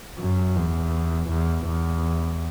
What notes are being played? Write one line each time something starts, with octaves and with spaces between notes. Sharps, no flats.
F#2
E2
E2
E2